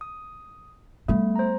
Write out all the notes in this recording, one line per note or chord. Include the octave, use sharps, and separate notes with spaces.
D#6
G3 A3 B3
C5 A#5